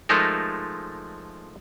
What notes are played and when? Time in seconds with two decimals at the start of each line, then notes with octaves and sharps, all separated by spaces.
0.09 F3 G#3 A3 D#4 A4 A#4